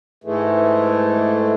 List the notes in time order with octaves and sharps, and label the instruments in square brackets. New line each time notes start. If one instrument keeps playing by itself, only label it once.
[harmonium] G#2 E3 G#3 A3